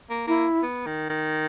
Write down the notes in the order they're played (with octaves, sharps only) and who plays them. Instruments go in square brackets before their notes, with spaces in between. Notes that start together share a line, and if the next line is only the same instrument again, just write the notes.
[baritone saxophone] A#3
[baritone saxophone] A#3 [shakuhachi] E4
[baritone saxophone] B3
D#3
D#3